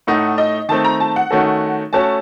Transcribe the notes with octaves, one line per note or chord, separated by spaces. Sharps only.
A2 A3 D#4 F#5
D#5
D#3 A3 C4 A5
A#5
A5
F#5
D#3 A3 C#4 F#4 A4
A3 C#4 F#4 A4 A5